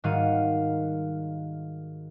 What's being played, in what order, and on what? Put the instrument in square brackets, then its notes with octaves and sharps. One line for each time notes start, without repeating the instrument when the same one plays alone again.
[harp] G#2 D#3 G3 F#4 F5 D#7